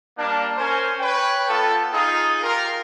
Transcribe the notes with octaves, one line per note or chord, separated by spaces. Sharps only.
G3 A#3 D4 A5
C#4 A#4 C5 G#5
B4 C#5 G5
B3 F4 A4 G5
D#4 F4 G#4
F4 G4 A#4